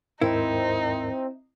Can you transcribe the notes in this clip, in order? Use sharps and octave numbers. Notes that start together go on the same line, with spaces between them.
D#2 G#2 C4 D#4 E4 A#4